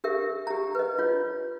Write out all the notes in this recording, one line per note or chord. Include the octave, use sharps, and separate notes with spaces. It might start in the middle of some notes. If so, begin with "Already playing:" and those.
G4 A#4 E5
G4 A#5
B4 D#5
F4 C#5